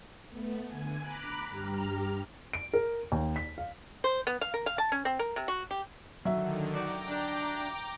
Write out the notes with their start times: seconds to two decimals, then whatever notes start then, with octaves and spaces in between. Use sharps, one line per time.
0.29 A3 B3
0.66 D3 G#5
1.00 A#5 B5 D6 F#6
1.49 G2 G4 A#5 F6
2.53 D7
2.74 A#4
3.12 D#2
3.36 B6
3.58 F5
4.04 C5
4.27 B3
4.41 F5
4.54 A#4
4.66 F5
4.78 A5
4.92 C#4
5.05 C4
5.19 A#4
5.36 C3
5.48 F#4
5.71 G4
6.25 D3 D#3 F#3 E5
6.75 D#4 F#4 D5 G5 A#5 D6
7.08 D4